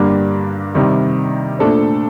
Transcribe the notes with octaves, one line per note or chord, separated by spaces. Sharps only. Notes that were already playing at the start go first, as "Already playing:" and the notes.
Already playing: G2 D3 G3 A#3 D4
C3 D#3 G3
A#2 A3 D4 A4 C5